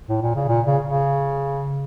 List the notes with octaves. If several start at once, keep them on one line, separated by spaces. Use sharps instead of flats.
A2
A#2
C#3
A#2
C#3
C#3